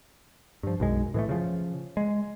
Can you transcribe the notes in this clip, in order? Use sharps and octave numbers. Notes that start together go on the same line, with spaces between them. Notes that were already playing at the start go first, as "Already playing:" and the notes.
G2 F3
B1 F#2 G#3
A2 E3 G#3 A3
C#3 F3
G#3